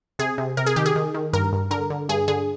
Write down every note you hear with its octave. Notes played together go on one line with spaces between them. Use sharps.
C3 G#4
C3
C3 A#4
G#4
D#3 G4
G#4
D#3
D#3
G2 A#4
G2
D3 A#4
D3
G2 G#4
D3 G#4